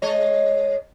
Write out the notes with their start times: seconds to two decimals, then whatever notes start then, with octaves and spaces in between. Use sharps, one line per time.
0.02 G#3 C#5 D#5